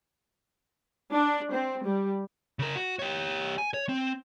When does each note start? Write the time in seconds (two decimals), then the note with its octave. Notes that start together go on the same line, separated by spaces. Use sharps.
1.13 D4
1.53 C4
1.84 G3
2.59 C#3 A#4
2.76 F#4
2.99 G4 C#5
3.58 G#5
3.74 C#5
3.89 C4